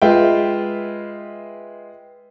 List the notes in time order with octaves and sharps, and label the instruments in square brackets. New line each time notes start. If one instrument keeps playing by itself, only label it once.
[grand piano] G#3 F4 B4 E5 G5